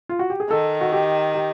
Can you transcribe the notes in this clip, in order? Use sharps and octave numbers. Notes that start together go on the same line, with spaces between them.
F4
F#4
G4
G#4
D#3 A4
F#4
G4
G4